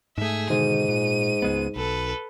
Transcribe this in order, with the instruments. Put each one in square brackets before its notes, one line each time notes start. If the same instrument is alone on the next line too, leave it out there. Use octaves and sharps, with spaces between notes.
[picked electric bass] G#2 A3 [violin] G#4 E5
[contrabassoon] G#2 [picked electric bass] B2 D3 D#3 [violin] D#7
[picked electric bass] A#2
C#2 G#3 B3
[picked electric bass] B1 [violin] A4 B4